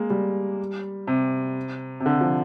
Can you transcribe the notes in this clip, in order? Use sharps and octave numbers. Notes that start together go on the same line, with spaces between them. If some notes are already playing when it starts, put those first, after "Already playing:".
Already playing: G#3 A#3
G3
C3
C3
D3
F3